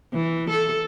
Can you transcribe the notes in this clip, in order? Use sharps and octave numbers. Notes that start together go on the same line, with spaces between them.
E3
A4